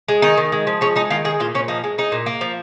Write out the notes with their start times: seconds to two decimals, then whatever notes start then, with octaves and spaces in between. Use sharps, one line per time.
0.09 G#3
0.22 D#3 D#4
0.37 D#3
0.52 G#3
0.67 F3
0.81 G#3 C#4
0.96 G#3 D#4
1.10 D#3 F4
1.25 G#3 G#4
1.40 A#2 F4
1.54 A#2 C#4
1.68 F3 D#4
1.84 G#3
1.98 G#3 D#4
2.12 A#2
2.26 A#3
2.41 F3